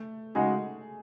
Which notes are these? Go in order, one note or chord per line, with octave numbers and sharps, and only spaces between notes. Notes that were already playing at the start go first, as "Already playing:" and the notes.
Already playing: A3
C#3 G#3 D#4 F#4 G#4